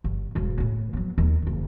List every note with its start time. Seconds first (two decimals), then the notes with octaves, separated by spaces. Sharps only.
0.04 G1
0.35 E1 G2
0.58 A2 C#3
0.93 F#3 B3
1.18 D#2 D#4
1.42 F#1 D3